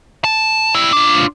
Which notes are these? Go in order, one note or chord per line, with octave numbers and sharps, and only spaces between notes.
A5
G3 E4
D4 F4